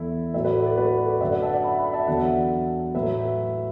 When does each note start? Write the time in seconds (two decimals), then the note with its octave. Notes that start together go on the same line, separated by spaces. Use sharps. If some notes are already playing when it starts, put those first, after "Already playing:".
Already playing: E2 E3 E4 A4
0.33 A2 F#3 B4 E5
0.44 F#4 B4
0.56 A4 D5
0.66 A4 D5
0.77 F#4 B4
1.06 A4 D5
1.20 F#2 D3 F#3 B4 E5
1.31 D5 F#5
1.42 E5 A5
1.53 D5 F#5
1.64 F#5 B5
1.79 F#5 B5
1.93 E5 A5
2.07 E2 D3 F#3 D5 F#5
2.95 A2 F#3 B4 E5